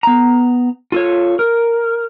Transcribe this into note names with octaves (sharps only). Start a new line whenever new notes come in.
B3 A#5
F4 A4 C#5
A#4